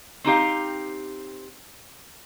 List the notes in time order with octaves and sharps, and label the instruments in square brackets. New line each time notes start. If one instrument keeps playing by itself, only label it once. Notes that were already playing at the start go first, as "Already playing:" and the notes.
[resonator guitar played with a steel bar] C4 D#4 G4 F5